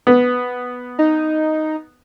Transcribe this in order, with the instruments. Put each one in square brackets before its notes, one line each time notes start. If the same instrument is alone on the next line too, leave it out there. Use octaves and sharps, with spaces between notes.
[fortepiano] B3
[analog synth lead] D#4